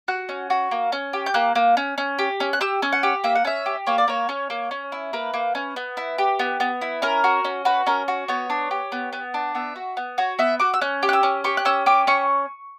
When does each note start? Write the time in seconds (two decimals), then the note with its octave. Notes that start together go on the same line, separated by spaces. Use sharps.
0.08 F#4 F#6
0.29 C#4
0.50 F#4
0.71 A#3
0.92 C#4
1.13 G4
1.26 G6
1.34 A#3 F#6
1.55 A#3
1.77 C#4
1.98 C#4
2.19 G4
2.40 C#4
2.53 F#6
2.61 G4 E6
2.82 C#4
2.93 F#5
3.03 G4
3.24 A#3 E5
3.35 F#5
3.45 C#4 E5
3.66 G4
3.87 A#3 C#5
3.98 D5
4.08 A#3 C#5
4.29 C#4
4.50 A#3
4.71 C#4
4.92 E4
5.13 A#3 B4
5.34 A#3
5.55 C#4
5.76 B3
5.97 E4
6.18 G4
6.39 B3
6.60 B3
6.81 E4
7.02 C#4 A#4
7.24 F#4
7.45 C#4
7.65 F#4 B4
7.87 C#4 A#4
8.08 F#4
8.28 B3 C#5
8.50 D4
8.71 G4
8.92 B3
9.13 B3
9.34 D4
9.55 B3 E5
9.76 F#4
9.97 B3
10.18 F#4 C#5
10.39 B3 E5
10.60 F#4 D6
10.74 E6
10.81 C#4 F#6
11.03 G4
11.09 F#6
11.13 E6
11.23 C#4
11.44 G4 C#6
11.57 F#6
11.65 C#4 E6
11.86 G4 D6
12.07 C#4 C#6